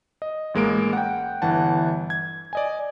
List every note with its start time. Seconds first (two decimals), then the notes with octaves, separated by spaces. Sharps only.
0.22 D#5
0.54 A1 G#3 A#3 D7
0.93 F#5 G5
1.42 G1 E3 F#5 A5
2.10 G#6
2.53 D5 D#5 G#5